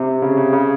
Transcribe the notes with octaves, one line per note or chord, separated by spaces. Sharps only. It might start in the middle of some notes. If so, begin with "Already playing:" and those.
Already playing: C3
C#3
C#3
C#3